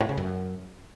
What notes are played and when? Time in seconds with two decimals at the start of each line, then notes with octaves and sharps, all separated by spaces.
0.01 A2
0.09 C#3
0.17 F#2